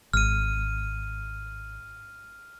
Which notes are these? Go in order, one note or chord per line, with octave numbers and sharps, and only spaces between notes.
G#1 F6 D#7